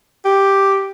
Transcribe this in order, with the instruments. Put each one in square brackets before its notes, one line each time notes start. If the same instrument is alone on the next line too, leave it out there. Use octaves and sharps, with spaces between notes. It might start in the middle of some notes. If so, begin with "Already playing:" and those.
[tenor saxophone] G4